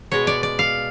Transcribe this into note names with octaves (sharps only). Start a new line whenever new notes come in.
B2 G#3 C#5
D5
D5
F5